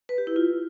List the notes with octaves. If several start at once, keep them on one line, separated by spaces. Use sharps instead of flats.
B4
G4
E4
F4